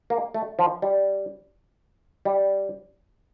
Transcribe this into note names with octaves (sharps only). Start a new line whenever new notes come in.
A#3
A3
F3
G3
G3